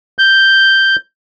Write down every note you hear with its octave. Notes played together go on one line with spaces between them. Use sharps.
G6